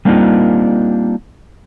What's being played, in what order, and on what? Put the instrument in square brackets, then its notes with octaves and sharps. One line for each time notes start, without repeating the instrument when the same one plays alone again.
[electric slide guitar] G3 A#3 C4 D4 D#4 F4